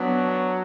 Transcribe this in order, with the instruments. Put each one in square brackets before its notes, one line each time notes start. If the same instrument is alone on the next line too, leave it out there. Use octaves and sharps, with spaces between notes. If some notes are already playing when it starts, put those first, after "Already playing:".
Already playing: [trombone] F#3 [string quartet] B3 D4